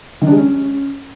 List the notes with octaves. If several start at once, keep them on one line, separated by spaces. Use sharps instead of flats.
D#3
D4
G#3
C#4